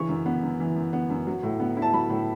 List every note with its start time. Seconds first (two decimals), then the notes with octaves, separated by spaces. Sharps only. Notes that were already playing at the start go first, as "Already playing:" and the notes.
Already playing: C#3 E3 C#6
0.09 F#2
0.26 B3
0.43 F#2
0.60 E3
0.76 F#2
0.93 B3
1.10 F#2
1.27 F#3
1.43 A2
1.60 B3
1.77 E4
1.82 A5
1.93 F#3 B5
2.10 A2